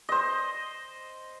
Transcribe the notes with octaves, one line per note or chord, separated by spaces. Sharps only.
C5 D#5